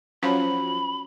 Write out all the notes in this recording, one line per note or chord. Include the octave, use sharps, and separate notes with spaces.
F3 F#3 C#4 B5